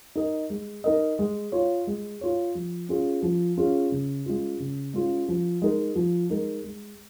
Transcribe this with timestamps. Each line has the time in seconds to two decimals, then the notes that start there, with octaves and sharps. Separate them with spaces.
0.15 D#4 A#4 D#5
0.50 G#3
0.84 D#4 A#4 D#5
1.19 G#3
1.52 F4 C#5
1.87 G#3
2.21 F4 C#5
2.55 F3
2.89 C#4 F4 G#4
3.22 F3
3.57 C#4 F4 G#4
3.92 C#3
4.26 G#3 C#4 F4
4.60 C#3
4.94 G#3 C#4 F4
5.28 F3
5.62 G#3 D#4 A#4
5.96 F3
6.30 G#3 D#4 A#4
6.64 G#3